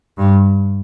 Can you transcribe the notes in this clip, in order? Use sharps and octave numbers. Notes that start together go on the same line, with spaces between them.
G2